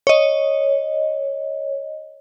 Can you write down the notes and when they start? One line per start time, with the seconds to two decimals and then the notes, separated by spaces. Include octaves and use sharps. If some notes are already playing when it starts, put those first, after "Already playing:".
0.07 C#5 D#5